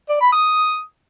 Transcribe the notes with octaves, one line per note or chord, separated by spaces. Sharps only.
D5
B5
D#6